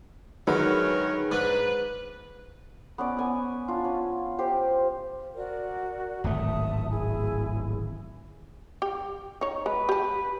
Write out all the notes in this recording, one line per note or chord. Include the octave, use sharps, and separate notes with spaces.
F#2 D3 D#3 F#3 G#3 A#4 B4 C#5
G#2 D4 B4
B3 C#4 D5
B3 G#5 D#6
D4 F4
C#4
G4 C5 G5
F#4 A#4 D5
D1 G#1 A3 E5 A5 D#6
E4 G#4 G#5
G4
D#4 C#5
G#3 B4
G4 A5